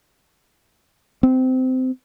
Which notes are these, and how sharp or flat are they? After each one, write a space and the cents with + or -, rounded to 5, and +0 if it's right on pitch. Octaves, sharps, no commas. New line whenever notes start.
C4 -20